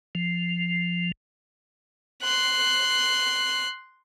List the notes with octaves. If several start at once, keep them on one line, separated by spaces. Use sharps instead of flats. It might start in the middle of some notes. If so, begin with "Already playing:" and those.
F3
C6 F#6